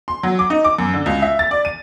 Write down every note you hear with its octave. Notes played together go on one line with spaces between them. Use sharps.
C6
F#3
D6
D#4
D6
F#2
D3
C#2
E5
A6
D5
D#7